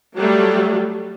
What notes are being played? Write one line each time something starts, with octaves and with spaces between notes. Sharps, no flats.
F#3 G3 A3